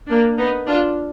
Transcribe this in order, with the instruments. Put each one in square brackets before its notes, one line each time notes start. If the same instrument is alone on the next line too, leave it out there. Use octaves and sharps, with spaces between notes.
[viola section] A#3 D4
B3 D#4
D4 F4